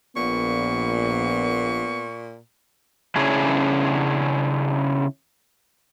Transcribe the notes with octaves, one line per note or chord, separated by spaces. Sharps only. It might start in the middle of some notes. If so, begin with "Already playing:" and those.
A#1 A#2 B3 C#6
C#3 C#4 D4 E4 G#4